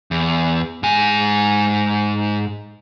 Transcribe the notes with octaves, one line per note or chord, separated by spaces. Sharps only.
E2
G#2 G#5